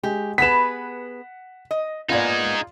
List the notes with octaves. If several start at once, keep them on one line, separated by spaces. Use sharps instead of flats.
G#3 G4
B3 G#4 B4 F#5 B6 E7
D#5
A#3 B3 D#4 F4 G#4 D5